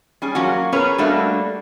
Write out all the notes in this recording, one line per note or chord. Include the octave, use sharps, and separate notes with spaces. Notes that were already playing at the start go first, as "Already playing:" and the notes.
G3 C#4 G#4
F#3 A#3 C#4 F4 F#4
B3 C#4 G#4 A#4 B4 C#5
G3 A3 A#3 D4 F#4 A4